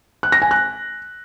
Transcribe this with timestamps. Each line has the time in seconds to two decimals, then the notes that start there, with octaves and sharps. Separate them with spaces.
0.23 F#6
0.32 A#6
0.42 G#5
0.51 F#6